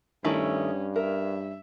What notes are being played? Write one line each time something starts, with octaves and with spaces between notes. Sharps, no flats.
G2 D#3 A3 C#4 E4
A#4 E5